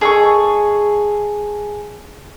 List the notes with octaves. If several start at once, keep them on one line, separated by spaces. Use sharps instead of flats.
D#3 G#4 A4 C#6